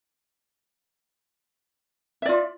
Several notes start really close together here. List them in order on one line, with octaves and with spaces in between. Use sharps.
E5 D5 F4